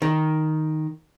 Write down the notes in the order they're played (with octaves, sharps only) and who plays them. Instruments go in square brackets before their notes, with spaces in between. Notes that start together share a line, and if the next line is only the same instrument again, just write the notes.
[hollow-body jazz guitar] D#3